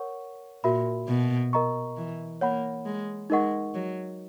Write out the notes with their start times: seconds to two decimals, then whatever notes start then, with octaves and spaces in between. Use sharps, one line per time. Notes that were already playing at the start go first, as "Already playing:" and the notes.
Already playing: A#4 C#5 F#5 C#6
0.64 A#2 F#4 A#4 E5 B5
1.08 B2
1.53 A#4 D#5 A#5 C#6
1.97 E3
2.41 A#3 C#5 F#5 B5
2.86 G#3
3.30 G#3 D#4 A#4 D#5 F#5 C#6
3.75 F#3